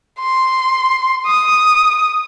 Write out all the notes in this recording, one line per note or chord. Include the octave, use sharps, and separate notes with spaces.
C6
D#6